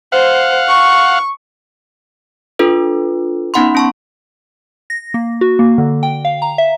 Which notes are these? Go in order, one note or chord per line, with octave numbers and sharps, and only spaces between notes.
C5 F5 F#5
C#6
D4 F4 A4 B4
B3 C#4 D#4 F#5 B5 C6
C#4 A5 C#6
A#6
A#3
F#4
A#3
D3
G5
F5
A#5
E5